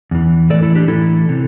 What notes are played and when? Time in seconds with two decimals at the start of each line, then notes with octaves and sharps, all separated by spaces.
0.11 E2 E3
0.50 A2 E3 A4 D5
0.62 E4 A4
0.75 D4 G4
0.88 A2 E3 E4 A4
1.29 C3 E3